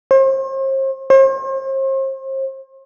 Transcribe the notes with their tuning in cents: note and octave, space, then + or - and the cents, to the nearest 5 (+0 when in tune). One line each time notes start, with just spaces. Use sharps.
C5 +40
C5 +40